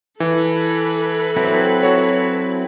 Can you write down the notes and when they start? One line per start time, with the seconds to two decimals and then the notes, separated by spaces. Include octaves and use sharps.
0.20 E3 A4 B4
1.36 F#3 C4 E4
1.83 F#4 C#5